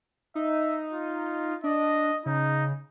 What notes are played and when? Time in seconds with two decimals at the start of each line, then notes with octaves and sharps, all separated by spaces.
0.35 D#4 E5
0.93 F4
1.64 D4 D#5
2.26 C#3 D#4